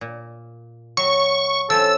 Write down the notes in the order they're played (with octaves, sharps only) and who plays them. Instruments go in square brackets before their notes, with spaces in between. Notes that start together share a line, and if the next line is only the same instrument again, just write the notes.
[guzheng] A#2
[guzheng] F#3 [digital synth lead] C#6
[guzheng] F3 C#4 [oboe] A4 [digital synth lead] E6